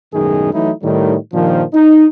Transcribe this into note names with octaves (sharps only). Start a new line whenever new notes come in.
B1 F#2 A2 D#3 G#3 G#4
E3 F#3 A3 D#4 E4
A2 D#3 G3
G2 A#2 D#3 F3
D#4